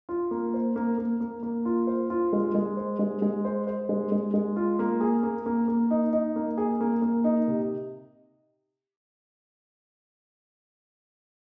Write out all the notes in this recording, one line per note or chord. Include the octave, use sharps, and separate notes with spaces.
F4
A#3
C5
A#3
A#3
A#3
A#3
F4
C5
F4
G#3
G#3
C5
G#3
G#3
C5
C5
G#3
G#3
G#3
F4
A#3
G#4
A#3
A#3
A#3
D#4
D#4
A#3
G#4
A#3
A#3
D#4
C3